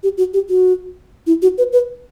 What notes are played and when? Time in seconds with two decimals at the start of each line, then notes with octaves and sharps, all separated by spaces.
0.03 G4
0.18 F#4
0.34 G4
0.49 F#4
1.27 E4
1.42 F#4
1.58 B4
1.73 B4